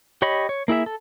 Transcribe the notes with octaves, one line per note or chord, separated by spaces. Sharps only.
G4 C#5 D#5 B5
C#5
A#3 E4 G#4 E5
A4